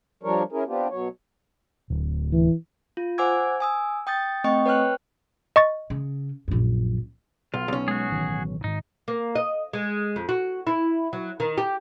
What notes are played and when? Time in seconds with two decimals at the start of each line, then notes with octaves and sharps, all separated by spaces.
0.23 F3 G3 D4 A#4 C#5
0.52 C#4 E4 G#4 A#4
0.68 B3 C4 D4 F4 G4
0.90 B2 F#3 C#5
1.90 D1
2.32 E3
2.97 F4
3.18 C5 F#5 G#5 D6 E6 G#6
3.60 G#5 D#6 E6
4.07 G5 D#6 G6 A6
4.44 A3 C4 D#5 G5 C#6
4.66 B4 C#5 G5 F6 F#6
5.56 D#5 C#6 A6
5.90 C#3
6.48 A#1 F#2
7.54 B1 F4
7.68 B1 C#4
7.88 G#3 F#4 G#4
8.10 A1 D#3 E3
8.64 G#2 D#3 D#4
9.08 A#3
9.35 D#5
9.73 G#3
10.16 F2
10.29 F#4
10.67 E4
11.13 F#3
11.40 D#3
11.58 G4